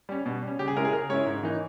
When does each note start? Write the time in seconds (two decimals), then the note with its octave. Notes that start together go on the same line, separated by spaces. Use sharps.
0.09 G3 C#4
0.26 B2
0.43 G3 C#4
0.59 C#3 G4
0.68 G#4
0.76 G#3 C#4 E4 A#4
0.85 G#4
0.93 C#3 A#4
1.09 G#3 C#4 E4 C#5
1.26 G#2
1.43 E3 A#3 D#4